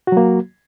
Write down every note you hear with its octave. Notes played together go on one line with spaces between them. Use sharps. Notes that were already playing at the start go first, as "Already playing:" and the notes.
F#3 A#3 F#4